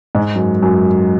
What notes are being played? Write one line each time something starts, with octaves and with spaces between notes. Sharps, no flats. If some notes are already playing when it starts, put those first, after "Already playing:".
G#2
F#2
F#2